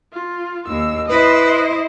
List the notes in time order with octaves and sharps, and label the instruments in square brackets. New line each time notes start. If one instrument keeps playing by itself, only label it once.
[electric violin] F4
[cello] D#2 [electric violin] E6
[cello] E4 C5 [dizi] B4 [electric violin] D#5